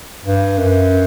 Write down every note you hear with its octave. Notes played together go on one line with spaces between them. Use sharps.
G2
F#2